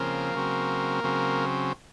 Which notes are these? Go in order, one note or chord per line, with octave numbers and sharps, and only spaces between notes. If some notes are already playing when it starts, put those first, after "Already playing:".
Already playing: C#3 F3 A#3 C4 A#4
C#3 F#3 C4
C#3 F#3 C4